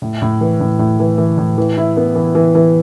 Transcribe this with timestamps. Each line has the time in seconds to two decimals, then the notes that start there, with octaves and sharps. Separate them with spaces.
0.02 A2
0.22 A2
0.41 E3
0.60 A2
0.79 A2
1.00 E3
1.18 E3
1.38 A2
1.58 E3
1.77 E4
1.97 B3
2.15 E3
2.35 E3
2.55 E3